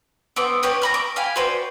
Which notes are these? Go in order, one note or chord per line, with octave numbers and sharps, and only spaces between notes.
B3 C4 D6
G4 B4 C#5 G5
A#5 B5 F6
D6
F5 G5 G#5 B5
F#4 B4 C5 D5